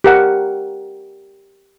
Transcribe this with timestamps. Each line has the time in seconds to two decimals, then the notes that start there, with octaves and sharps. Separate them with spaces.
0.04 G4 A#4 F#5